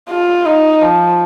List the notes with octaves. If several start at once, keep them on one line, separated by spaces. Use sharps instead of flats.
F4
D#4
F3